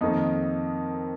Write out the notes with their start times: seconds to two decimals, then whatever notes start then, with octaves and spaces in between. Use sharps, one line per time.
0.01 F2 D#3 A#3 D#4